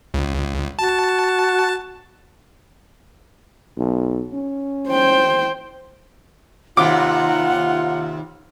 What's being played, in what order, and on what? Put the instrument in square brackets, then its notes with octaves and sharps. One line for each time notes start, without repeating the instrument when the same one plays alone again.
[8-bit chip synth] C#2
[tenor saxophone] F#4 [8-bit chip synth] A5
[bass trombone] B1
C#4
[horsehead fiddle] C5 G5
[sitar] D#2 C3 [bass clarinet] F4 [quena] F#5 [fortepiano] D6